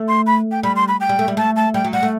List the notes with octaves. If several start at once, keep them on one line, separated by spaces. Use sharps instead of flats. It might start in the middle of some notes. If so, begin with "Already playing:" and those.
Already playing: A3
C6
B5
G5
G3 B5
C6
B5
G5
G3
A3
G3
A3 A5
A5
G3 G5
F#3
G3 F#5
A3